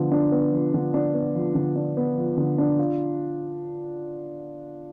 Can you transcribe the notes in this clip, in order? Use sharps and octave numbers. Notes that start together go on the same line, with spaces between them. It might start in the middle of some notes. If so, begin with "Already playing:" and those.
Already playing: D3 F3 B3
D4
B3
F3
D3
D4
B3
F3
D3
D4
B3
F3
D3
D4
F4